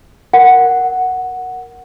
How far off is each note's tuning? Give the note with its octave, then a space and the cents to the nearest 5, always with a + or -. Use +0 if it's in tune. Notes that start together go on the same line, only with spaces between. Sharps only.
A#4 +0 F#5 +0